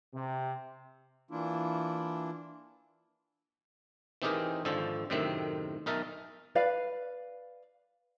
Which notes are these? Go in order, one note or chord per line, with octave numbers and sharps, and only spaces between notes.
C3
E3 A#3 D4 E4 F4
E3 C4 D#4 G4 G#4 A#4
G#1 D3 F3 A4 C5
F#2 A2 C3 D#3 C4 E5
B1 D#4 A#4 E5 A5
B4 D5 F5